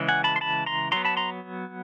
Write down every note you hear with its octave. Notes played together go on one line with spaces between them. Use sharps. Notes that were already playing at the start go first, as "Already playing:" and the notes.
Already playing: C#3 E3 G#3
F#5 G#5
A5 B5
C6
A5 B5
A#5 C6
F#3 B3 A#5 C6
A5 B5
A#5 C6